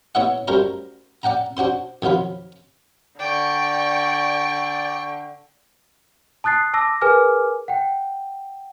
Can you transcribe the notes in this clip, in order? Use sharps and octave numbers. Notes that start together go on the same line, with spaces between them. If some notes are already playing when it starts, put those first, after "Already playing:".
B3 E4 C#5 D#5 F#5
F#2 G3 A3 A#4 C5 A#5
D5 F#5 G5 A#5
D4 F#4 C5 C6
F2 D#3 F#3 F4 B5
D3 D5 G5 C#6
A5 D#6 F#6 A6 C7
A5 D6 E6 A#6
G#4 A#4 B4 G#5 D6 F6
F#5 G5